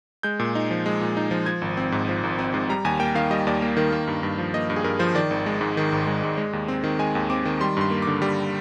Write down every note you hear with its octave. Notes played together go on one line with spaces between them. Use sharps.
G#3 G6
A#2
D#4
F3
G#3
A#2
D#4
F3
F3 G#6
G#1
C4
G#2
F3
G#1
C4
G#2
G3 A#5
D#2 G#5
A#3 G5
D#3 F5
G3 D#5
D#2 D5
A#3
D#3 A#4
A#3
G2
G2
F3
A#3 D#5
G2
G#4
G2 A#4
F3 C5
D#3 D5
G#1
G#3
G#2
D#3
G#1
G#3
G#2
G#3
D#2
C4
D#3
G#3 G#5
D#2
C4 D6
D#3
G3 C6
G2 C6
A#3
D3 D6
G3